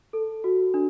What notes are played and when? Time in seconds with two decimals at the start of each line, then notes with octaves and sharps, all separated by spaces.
0.13 A4
0.44 F#4
0.74 D4